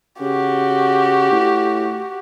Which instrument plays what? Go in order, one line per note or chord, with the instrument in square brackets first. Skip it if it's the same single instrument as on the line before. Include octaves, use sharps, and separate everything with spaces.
[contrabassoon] C#3 [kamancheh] F#4 G4
[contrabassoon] A2